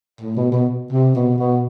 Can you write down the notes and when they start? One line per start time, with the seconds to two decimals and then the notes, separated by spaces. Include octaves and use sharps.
0.21 A2
0.37 B2
0.52 B2
0.92 C3
1.15 B2
1.39 B2